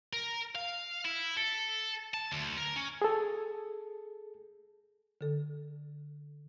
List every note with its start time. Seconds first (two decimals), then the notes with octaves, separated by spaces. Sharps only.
0.13 A#4
0.55 F5
1.05 E4
1.37 A4
2.14 A5
2.32 D2
2.58 A#4
2.76 C#4
3.02 G#4 A4
5.21 D3 A4